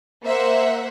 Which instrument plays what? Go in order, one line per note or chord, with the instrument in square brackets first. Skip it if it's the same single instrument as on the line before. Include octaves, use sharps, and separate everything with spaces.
[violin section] A#3 C5 E5 F#5